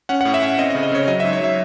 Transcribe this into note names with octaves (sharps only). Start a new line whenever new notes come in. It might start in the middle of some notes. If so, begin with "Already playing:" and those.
C#4 F#5
F#5
A2
E5
C#4
C4 D#5
D#5
C#3
D#5
C#3 C#5
F#3 D#5
E5
G#2
C#5
F#3 E5